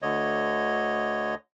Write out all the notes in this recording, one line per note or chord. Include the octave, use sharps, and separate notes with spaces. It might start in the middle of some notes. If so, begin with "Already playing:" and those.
D2 D3 C#5 D#5